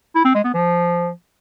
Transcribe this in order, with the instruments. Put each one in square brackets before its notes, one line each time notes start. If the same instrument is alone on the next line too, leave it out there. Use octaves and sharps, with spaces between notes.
[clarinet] E4
C4
G#3
B3
F3